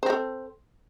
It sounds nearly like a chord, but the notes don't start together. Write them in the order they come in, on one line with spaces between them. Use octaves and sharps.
C5 C4 A4